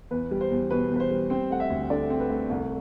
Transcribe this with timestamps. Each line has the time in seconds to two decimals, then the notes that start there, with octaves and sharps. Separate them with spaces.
0.11 E2 B4
0.31 G3
0.41 C5
0.50 E2
0.71 B2 B4
0.90 E2
0.96 B4
1.00 C5
1.11 G3
1.30 C4 C5
1.50 A3 F#5
1.60 E5
1.70 D2
1.90 D3 D5
2.10 C4
2.20 B4
2.30 A3
2.50 C2